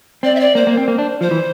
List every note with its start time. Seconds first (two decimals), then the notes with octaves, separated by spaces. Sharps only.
0.23 C4 D5
0.35 E5
0.39 D5
0.55 A#3 C5
0.67 A#3
0.77 C4
0.88 A#3
0.98 D4
1.21 F3 C5
1.31 E3